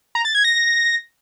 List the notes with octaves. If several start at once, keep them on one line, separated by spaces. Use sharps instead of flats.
A#5
A6
G#6
A#6